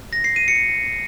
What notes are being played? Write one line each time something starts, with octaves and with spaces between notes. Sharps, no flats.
A#6
C7
D#7
C#7